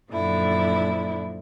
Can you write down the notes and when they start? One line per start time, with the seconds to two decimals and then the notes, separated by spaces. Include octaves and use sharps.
0.11 F#2 A#2 D3 F3 E4